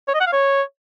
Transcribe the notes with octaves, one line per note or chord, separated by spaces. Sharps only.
C#5
D#5
F#5
F5
C#5